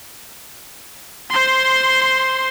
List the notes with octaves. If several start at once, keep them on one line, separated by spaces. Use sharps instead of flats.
C5 C6